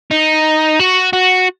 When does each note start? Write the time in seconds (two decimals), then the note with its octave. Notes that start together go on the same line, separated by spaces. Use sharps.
0.11 D#4
0.80 F#4
1.13 F#4